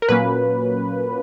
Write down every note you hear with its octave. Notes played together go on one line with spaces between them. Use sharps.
A#4
A#2 F#3 A#3 C#4 B4